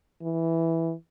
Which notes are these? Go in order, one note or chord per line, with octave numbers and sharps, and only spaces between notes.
E3